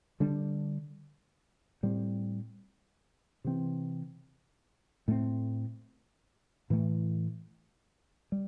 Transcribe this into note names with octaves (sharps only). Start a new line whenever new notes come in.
D3 G3 D4
A2 G3 C4
C3 E3 C4
A2 A3 C4
A2 E3 A3
G3